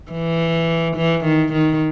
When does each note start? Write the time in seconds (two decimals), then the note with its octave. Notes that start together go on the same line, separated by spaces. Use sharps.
0.11 E3
0.96 E3
1.24 D#3
1.53 D#3